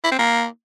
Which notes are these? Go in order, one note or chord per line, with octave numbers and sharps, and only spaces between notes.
E4
C4
A#3